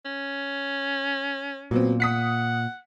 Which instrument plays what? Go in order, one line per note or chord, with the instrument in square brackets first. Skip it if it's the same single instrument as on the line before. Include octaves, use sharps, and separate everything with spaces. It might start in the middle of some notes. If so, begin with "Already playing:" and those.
[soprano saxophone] C#4
[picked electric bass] A#2 [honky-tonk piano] F#3 B3 C4
[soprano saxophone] F#5 [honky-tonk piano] D#6 B6 C#7